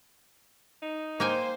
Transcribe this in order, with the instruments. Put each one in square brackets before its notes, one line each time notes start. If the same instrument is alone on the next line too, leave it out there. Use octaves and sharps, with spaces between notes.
[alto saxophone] D#4
[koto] A#3 G5 G#5 [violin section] C5